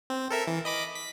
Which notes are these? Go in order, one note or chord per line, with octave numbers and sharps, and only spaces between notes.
C4
A4 A#4 E5
E3
D#5 B5 D6
B6